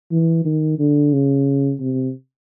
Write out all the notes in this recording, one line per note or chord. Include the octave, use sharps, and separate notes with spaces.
E3
D#3
D3
C#3
C3